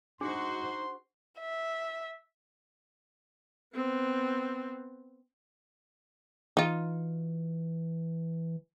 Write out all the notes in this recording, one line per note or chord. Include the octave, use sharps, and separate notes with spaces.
D4 D#4 F#4 G#4 C5 C6
E5
B3 C4
E3 D#4 F4